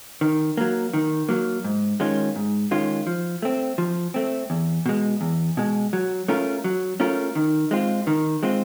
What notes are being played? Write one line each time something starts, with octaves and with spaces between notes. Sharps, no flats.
D#3
F#3 A#3
D#3
F#3 A#3
G#2
D#3 G#3 C#4 F4
G#2
D#3 G#3 C#4 F4
F3
A3 C4
F3
A3 C4
E2
B2 G#3
E2
B2 G#3
F#3
A3 C#4 F4 A#4
F#3
A3 C#4 F4 A#4
D#3
G#3 C4 F4
D#3
G#3 C4 F4